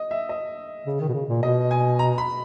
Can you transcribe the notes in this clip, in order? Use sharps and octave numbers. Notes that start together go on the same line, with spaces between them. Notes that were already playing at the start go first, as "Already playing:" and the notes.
Already playing: D#5
E5
D#5
C#3
D#3
B2
C#3
A#2
B2 D#5
G#5
A#5
B5